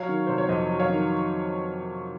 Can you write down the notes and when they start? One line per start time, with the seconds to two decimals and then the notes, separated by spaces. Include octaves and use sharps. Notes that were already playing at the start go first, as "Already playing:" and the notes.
Already playing: F#3 C#5 F5
0.09 D#3
0.27 C3 C5
0.38 C#5
0.49 F2 C5 D#5
0.69 F#3
0.80 C#5 F5
0.89 D#3